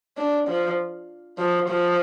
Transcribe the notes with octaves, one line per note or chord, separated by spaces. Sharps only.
D4
F3
F3
F3